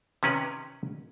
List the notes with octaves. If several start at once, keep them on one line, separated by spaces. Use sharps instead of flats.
C3 D#3 C#4 A#4 B4